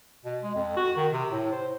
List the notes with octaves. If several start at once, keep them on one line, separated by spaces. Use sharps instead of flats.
B2
G#3
F2
F#4
D#3
C3
A2
C5